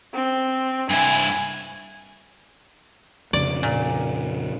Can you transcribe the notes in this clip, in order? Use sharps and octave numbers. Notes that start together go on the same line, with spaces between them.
C4
G2 E4 G#5
F2 C#3 D5
A#2